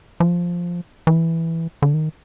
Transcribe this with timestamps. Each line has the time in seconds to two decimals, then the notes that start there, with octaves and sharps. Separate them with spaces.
0.20 F3
1.07 E3
1.82 D3
1.94 D#3